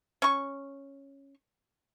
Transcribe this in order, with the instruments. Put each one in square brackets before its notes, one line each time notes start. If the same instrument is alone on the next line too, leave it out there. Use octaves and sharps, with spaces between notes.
[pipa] C#4 C#6